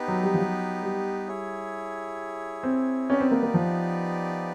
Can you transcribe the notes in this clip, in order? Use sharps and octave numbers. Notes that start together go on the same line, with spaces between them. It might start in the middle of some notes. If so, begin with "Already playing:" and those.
Already playing: B3 D#4 G4 B4
F#3
G3
F3
F#3
G3
E4 G#4 C#5
C4
B3 C#4 D#4 G4 B4 D5
C4
A#3
A#3
F3